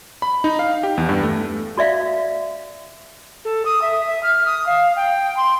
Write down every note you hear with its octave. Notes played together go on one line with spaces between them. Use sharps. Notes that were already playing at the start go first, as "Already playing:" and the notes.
B5
D#4
F5
G4
E2
G2
A3
F#4 D5 E5 F5
A4
D#6
E5
E5
F6
D#6
F5
G5
C6